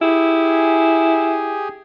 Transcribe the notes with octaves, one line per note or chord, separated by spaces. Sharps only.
E4 G4 G#4 G#5